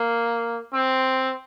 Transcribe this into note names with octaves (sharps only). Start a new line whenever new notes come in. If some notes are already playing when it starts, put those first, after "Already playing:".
Already playing: A#3
C4